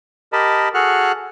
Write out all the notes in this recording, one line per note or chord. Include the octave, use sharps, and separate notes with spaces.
G4 A#4 D#5 A5 B5
F#4 G#4 A4 F#5 F6 F#6